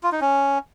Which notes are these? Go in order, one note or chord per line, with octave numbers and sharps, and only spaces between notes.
F4
D#4
C#4